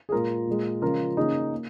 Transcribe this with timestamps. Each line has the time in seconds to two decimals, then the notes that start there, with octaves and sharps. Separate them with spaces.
0.09 G#4
0.12 A#2 G#3 F4 A#4
0.47 A#2 G#3
0.82 C#3 F3 G#3 F4 A#4
1.17 C#3 A#3 D#4 G#4
1.52 A#3